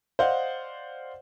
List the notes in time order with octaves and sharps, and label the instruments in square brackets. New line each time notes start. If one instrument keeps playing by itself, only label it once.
[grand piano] C5 D5 D#5 F5 F#5